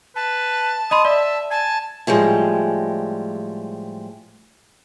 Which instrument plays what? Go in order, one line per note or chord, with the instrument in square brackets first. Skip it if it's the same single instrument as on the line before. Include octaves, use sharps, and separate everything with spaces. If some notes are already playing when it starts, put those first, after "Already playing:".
[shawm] B4 [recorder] A5
[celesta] D#5 B5 C6 [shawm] D#6
[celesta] D5 [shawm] E5
[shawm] G#5 [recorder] A5
[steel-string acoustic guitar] A2 F3 G3 G#3